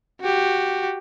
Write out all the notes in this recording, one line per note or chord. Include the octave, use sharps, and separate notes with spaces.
F#4 G4